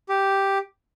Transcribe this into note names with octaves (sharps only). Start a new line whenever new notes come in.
G4